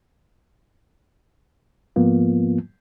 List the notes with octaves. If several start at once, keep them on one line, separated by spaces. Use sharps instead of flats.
G#2 F3 A#3 B3 F4